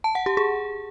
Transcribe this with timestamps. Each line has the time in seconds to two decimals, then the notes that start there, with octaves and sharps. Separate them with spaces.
0.04 A5
0.15 F#5
0.26 G4
0.37 G#4